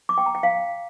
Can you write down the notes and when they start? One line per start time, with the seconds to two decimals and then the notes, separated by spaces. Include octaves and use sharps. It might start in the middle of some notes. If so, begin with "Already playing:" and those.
0.09 D6
0.18 G5
0.26 A#5
0.35 G5
0.43 F5